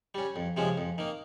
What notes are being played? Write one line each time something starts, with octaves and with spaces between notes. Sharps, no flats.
G3 C#4
F2
C3 F3 G#3 C#4
F2
D#3 A#3